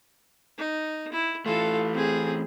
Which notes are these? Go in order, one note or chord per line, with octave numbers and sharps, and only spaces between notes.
D#4
E4
E3 A3 F4 A4
C4 G#4